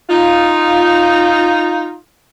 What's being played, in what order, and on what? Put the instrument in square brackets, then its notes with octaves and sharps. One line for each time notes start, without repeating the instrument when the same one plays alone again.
[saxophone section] D#4 F4